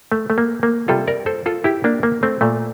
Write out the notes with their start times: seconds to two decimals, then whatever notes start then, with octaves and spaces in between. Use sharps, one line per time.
0.12 A3
0.30 A3
0.38 A#3
0.63 A#3
0.88 C3 G3 F4 A4
1.07 A#4 D5
1.26 A4 C5
1.46 F4 A4
1.64 E4 G4
1.84 A#3 D4
2.03 A#3
2.23 A3 C4
2.41 A#2 A3